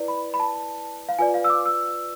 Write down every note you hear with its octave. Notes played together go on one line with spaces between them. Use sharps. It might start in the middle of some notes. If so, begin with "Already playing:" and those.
Already playing: E4 B4 D5
B5
B5
A5
F5
F4 B4 D5 G#5
F5
E6
D6
E6